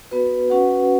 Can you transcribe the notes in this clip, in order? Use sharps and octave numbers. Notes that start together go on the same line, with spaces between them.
B3 F#4 B4
C#4 F#4 B4 F#5